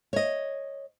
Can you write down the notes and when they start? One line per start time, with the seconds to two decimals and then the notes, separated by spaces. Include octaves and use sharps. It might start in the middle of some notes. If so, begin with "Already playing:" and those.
0.13 C#5 D#5